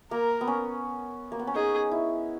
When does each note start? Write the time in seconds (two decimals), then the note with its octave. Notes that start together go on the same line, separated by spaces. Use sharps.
0.11 A#3 A#4
0.41 B3
0.47 C#4
1.32 A#3
1.39 B3
1.47 C#4
1.55 D#4 G#4
1.91 E4